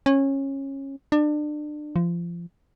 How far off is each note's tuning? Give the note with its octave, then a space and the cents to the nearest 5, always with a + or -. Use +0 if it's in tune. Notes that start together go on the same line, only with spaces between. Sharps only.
C#4 -20
D4 +30
F3 -25